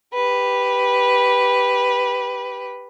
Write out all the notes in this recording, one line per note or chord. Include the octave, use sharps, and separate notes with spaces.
G4 B4